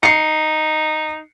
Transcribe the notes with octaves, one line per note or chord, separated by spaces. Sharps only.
D#4 C7 C#7